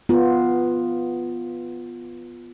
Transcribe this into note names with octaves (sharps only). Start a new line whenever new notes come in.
B3 F4